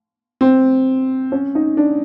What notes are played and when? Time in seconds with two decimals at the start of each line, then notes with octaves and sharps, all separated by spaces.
0.41 C4
1.32 C#4
1.55 D#4
1.77 D4